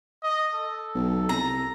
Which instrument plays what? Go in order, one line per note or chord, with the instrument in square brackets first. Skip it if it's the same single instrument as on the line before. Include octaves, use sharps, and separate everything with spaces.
[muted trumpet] D#5
A4
[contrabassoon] B1
[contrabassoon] C2 [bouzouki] A#5